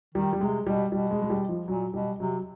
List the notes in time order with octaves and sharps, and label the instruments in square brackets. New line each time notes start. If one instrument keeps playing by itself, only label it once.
[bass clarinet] D#3 [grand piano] G3
[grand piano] G3
[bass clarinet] C3 [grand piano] G#3
[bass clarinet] B2 [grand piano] G3
[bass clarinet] B2 [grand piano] G3
[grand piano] G#3
G#3
G3
F3
[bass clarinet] A#2 [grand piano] F#3
[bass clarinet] B2 [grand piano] G3
[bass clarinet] C3 [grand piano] F#3